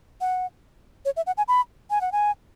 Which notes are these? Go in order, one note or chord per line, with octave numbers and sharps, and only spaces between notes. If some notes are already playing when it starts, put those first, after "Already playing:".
F#5
C#5
E5
F#5
G#5
B5
G#5
F#5
G#5